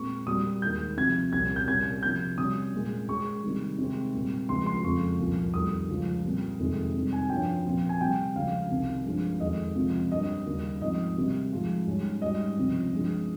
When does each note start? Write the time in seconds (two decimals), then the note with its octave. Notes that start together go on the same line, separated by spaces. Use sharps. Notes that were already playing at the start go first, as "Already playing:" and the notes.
Already playing: A#2 G#3 C4 C#6
0.27 A#2 G3 C4 D#6
0.62 D#2 D#3 G#3 G6
0.97 C3 F3 C4 G#6
1.33 C2 A#2 G3 C#4 G#6
1.56 G6
1.67 C2 A#2 G3 A#3 C#4 G#6
2.03 C3 F3 C4 G6
2.38 C3 G3 C#4 D#6
2.73 A#2 G#3 C#4
3.08 A#2 G#3 C#4 C#6
3.43 C3 D#3 G3
3.79 C3 D#3 G#3 C4
4.14 A#2 G3 C4
4.49 C#2 C#3 F3 G#3 C4 C6
4.66 C6
4.84 F2 C#3 F3 G#3 C4 C#6
5.19 C2 A#2 F3
5.54 F2 D#3 G3 D#6
5.89 C#2 C#3 F3
6.24 A#2 G3 C4
6.59 F2 C3 D#3 G#3 C4
6.95 C3 D#3 G3
7.13 G#5
7.30 G2 F3 A#3 C#4 G5
7.65 A#2 F3 C4
7.89 G#5
8.01 C3 G3 C4 G5
8.35 C#2 C#3 F3 F5
8.70 C2 C3 D#3
9.05 G2 F3 G#3 C#4
9.40 F2 D#3 G#3 D#5
9.76 C#2 C3 F3 C4
10.12 G2 G3 A#3 C#4 D#5
10.46 D#2 C#3 G3
10.81 G#2 F3 C4 D#5
11.16 C3 G3 A#3
11.52 G#2 F3 G#3
11.87 G#2 G3 C#4
12.22 G#2 G3 C#4 D#5
12.57 C#2 C3 F3 C4
12.92 G2 F3 G#3 C#4